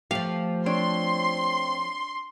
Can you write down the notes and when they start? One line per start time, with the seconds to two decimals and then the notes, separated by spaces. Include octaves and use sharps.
0.11 F3 A3 G4 F5
0.66 C4 D4 C#5 C6